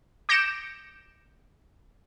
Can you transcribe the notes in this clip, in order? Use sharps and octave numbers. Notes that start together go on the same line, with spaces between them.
D6 G6 A#6 C#7 D7 E7